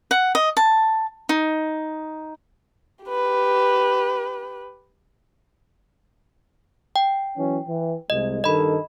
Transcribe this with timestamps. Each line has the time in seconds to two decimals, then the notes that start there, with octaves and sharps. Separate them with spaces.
0.11 F#5
0.35 D#5
0.57 A5
1.29 D#4
3.05 G4 B4
6.96 G5
7.37 E3 F#3 C#4
7.67 E3
8.10 C2 G#3 D#5
8.44 G2 D#3 A4 D#5 B5